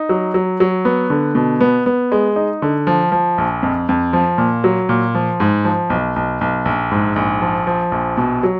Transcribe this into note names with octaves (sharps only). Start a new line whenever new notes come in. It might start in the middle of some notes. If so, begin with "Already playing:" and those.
Already playing: D#4
F#3
F#3
F#3
B3
D3
B2
B3
B3
G#3
D#4
D3
F3
F3
A#1
F2
F2
F3
A#2
F#3
A#2
F3
G#2
F3
B1
B1
B1
A#1
G#2
A#1
F3
F3
A#1
B2
F#3